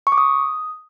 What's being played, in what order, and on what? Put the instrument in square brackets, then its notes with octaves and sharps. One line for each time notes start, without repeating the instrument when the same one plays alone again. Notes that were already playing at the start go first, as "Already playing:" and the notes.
[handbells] C#6
D6
D#6